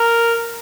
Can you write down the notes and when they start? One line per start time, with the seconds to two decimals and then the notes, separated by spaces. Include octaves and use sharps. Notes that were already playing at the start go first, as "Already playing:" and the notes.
Already playing: A#4